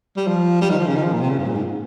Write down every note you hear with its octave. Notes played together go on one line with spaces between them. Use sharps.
G3
F3
G3
D#3
F3
C#3
D#3
F3
A#2
C3
C#3
G2
A#2
G#2